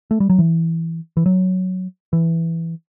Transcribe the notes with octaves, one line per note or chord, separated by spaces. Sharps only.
A3
G3
F#3
E3
E3
F#3
E3